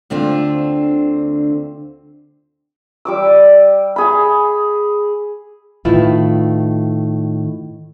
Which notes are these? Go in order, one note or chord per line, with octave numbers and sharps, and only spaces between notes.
D2 D3 C4 F4
G3 D6 E6
G#4 B5
A2 D#3 E4 F4 B4